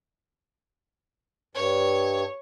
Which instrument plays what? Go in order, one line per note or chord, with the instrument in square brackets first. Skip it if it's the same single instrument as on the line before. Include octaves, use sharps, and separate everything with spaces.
[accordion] G2 [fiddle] C#5